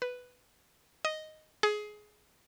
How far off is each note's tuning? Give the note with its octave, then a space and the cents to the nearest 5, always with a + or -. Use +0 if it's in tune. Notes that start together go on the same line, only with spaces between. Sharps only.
B4 +5
D#5 +0
G#4 +20